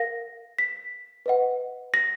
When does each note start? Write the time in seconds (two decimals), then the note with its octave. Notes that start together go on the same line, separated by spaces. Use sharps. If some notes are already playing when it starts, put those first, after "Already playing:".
Already playing: A#4 F5 A#6
0.59 B6
1.26 B4 D#5 F#5
1.94 A#6